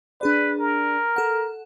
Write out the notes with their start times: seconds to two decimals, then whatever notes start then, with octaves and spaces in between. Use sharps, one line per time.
0.21 D4 G#4 B4 D5
0.59 A#4
1.16 A4 F#5